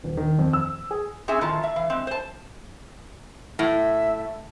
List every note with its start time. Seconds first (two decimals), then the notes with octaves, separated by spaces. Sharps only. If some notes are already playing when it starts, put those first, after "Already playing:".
0.04 D#1
0.17 D#3
0.39 F2
0.53 E6
0.91 G#4
1.28 C4 C#4 G#4 E5 G#5
1.41 A2 D#3 F3 F4 A5
1.63 A2 E5
1.76 E3 F5
1.90 G#3 C4
2.07 C5 A5
3.59 A2 E5